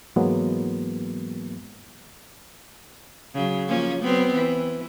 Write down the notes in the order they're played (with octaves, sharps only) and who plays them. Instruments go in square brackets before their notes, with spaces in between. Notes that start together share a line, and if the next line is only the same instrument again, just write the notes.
[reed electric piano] G#2 E3 F#3 G#3 A#3 B3
[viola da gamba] C#3 F#3
F3 A#3 C#4
F#3 B3 C4
E3